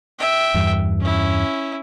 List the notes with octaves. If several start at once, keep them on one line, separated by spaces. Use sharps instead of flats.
E5 G5
E2 G2
C#4 E4